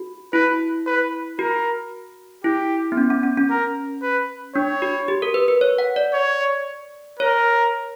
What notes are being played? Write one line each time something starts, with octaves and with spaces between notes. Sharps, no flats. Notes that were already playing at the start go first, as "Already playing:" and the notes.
Already playing: F#4
E4 B4
B4
F#4 A#4
E4 G4
B3
C#4
C#4
C#4
C#4
A#4
B4
D4 C#5
F#4
G4
A#4
B4
B4
C#5
F#5
D5
C#5
A#4 C#5